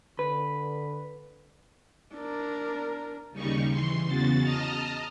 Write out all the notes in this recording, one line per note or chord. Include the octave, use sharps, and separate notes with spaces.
D3 B4
D4 A#4
D#2 C#3 G3 D#4 C#6
E3 C6
E2 C#3 F#4 A6
D#5 A5 A#5 D#6 F6